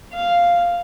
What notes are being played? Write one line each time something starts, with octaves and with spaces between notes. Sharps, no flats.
F5